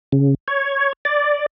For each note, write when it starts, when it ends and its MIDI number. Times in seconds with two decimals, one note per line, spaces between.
0.12 0.34 49
0.48 0.93 73
1.05 1.46 74